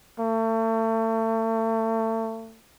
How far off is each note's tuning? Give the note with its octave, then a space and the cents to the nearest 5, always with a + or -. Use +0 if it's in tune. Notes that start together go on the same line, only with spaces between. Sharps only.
A3 +35